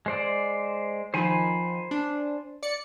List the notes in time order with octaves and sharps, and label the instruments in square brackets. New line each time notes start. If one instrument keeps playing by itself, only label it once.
[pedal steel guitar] G#3 C5 D5
[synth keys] D#3 F3 [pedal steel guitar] C5 G#5 B5
[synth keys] D4
D5 C#7